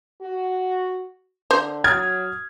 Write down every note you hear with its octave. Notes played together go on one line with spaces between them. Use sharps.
F#4
D3 C5
F#3 D#6 F6 G#6